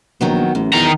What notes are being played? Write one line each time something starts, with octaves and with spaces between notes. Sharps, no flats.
A#1 D#3 F#3 B3
A1 F#2
E2 D#3 A#5